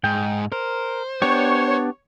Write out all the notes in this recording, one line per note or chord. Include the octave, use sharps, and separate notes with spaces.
G#2 G5
A#4 C5
B3 D4 G4 C#5